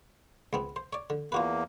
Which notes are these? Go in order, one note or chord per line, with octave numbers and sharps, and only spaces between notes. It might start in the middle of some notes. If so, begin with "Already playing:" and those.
C#2 B3 C4
C5
C#5 D5
D3
E2 A#3 F4 F#4 B4